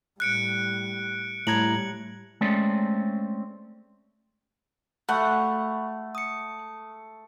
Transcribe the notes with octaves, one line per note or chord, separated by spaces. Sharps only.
A2 G3 F#6 C#7 D7
A2 G3 A#5 G#6 F#7
G#3 A3 C4 C#4 D5
A3 F#5 B5 C#6
D#6 C#7